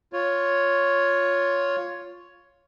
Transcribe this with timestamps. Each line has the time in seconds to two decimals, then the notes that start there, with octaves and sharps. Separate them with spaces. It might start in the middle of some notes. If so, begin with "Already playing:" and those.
0.13 F4 C#5